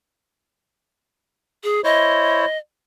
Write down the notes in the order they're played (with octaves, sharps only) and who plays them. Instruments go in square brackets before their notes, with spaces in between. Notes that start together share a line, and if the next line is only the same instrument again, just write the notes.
[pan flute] G#4
[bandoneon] E4 C5 C#5 [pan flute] D#5